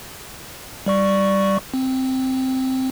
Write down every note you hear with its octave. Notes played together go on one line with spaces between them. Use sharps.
G3 D5 C#6
C4